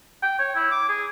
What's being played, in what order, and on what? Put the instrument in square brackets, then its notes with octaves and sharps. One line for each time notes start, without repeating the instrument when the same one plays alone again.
[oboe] G5
C#5
E4
D6
G#4